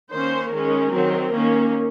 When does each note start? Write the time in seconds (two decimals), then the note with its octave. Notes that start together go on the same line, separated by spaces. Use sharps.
0.11 D#3 A#3 C#4 C5
0.51 D#3 G#3 C#4 A#4
0.92 D#3 F#3 C4
1.32 D#3 A#3 C#4